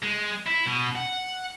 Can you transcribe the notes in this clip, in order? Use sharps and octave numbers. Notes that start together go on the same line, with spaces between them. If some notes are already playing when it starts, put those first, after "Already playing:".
G#3
E4
B2
F#5